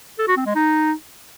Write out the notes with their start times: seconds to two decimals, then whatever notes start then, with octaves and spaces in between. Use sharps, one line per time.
0.19 A4
0.28 F#4
0.37 C4
0.46 G#3
0.55 D#4